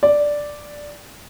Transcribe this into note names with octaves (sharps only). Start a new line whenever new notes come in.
D5